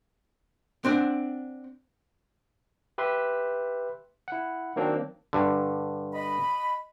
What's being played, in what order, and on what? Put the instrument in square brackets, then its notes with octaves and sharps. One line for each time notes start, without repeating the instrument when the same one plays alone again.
[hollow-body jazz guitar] C4 D4 F#5
[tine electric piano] G4 B4 E5 C6
E4 F#5
D#3 F#3 A#3 C4 D4
[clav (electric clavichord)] G2 D3
[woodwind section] D#5 B5